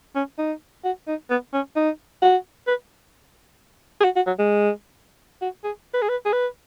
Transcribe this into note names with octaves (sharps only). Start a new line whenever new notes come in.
C#4
D#4
F#4
D#4
B3
C#4
D#4
F#4
B4
G#4
F#4
F#4
F#3
G#3
F#4
G#4
B4
G#4
B4
G#4
B4